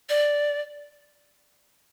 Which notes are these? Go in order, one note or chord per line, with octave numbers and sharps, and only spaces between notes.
D5